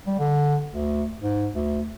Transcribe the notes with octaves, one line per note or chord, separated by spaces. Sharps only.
G3
D3
D2
G#2
D2